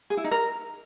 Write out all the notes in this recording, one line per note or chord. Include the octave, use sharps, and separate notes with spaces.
G#4
E4
D#4
A#4